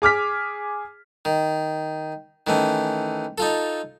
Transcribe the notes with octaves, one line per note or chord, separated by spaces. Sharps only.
G#4 D6 F6 B6
D#3
D#3 E3 A3 C#4
D#4 F4 A4